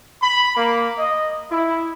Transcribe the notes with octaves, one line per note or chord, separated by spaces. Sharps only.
B5
A#3
D#5
E4